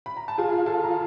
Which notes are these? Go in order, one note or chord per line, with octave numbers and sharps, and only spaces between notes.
B5
A#5
A5
F4 G#4 G#5
F4 A4 A5
A#5